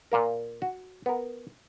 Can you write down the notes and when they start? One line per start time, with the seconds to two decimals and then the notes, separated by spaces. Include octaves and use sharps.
0.12 A#2 A#3 A#4
0.62 F#4
1.06 B3 A#4